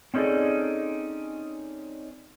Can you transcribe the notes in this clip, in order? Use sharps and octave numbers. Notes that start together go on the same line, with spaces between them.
C4 C#4 D#4 G#4 A4 D5